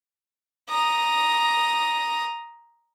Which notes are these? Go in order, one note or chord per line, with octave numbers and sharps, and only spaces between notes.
A#5 D#6